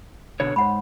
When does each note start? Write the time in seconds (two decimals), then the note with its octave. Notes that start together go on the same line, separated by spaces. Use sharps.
0.40 B2 D3 C#5
0.56 G#2 C#5 F#5 B5